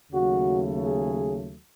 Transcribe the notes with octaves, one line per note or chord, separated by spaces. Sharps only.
D#2 C#3 F#3 A3 F#4
G#4